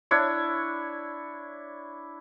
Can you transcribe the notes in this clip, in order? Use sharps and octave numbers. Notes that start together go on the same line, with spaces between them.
D4 E4 C#5